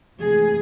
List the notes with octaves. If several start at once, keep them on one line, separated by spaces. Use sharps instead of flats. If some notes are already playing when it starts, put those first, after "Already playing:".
D2 C3 E3 G#3 G#4